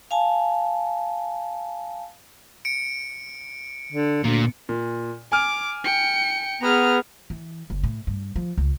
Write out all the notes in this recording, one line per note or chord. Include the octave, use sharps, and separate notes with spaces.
F5 G#5 A5
C#7 D7
D3
D2 A#2
A#2
G#5 D6 F6
G5 C#7
B3 G#4 A#5 F6
E3
F#1
A2
G2
F3
C#2